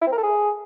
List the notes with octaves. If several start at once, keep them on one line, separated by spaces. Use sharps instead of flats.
E4
C4
A#4
A4
G#4